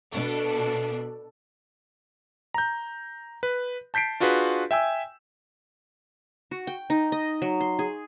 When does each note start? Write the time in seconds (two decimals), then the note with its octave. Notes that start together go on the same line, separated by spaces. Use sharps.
0.12 B2 A3 D4
2.54 A#5 G6
3.43 B4
3.94 A5 G6 B6 C7 D7
4.20 D4 F4 F#4 G#4 B4
4.71 E5 G5 G#5 E6
6.51 F#4
6.67 G5
6.90 D#4
7.12 D#5
7.42 F#3
7.61 C6
7.79 G#4